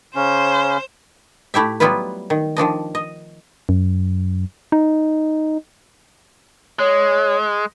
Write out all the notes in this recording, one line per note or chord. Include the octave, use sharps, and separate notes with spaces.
C#3 C#4 C5
A2 A3 E4 G4 E5
F#3 G3 B3 E4 F4 B4
D#3
D#3 F3 D4 D#5
D#5
F#2
D#4
G#3 C#5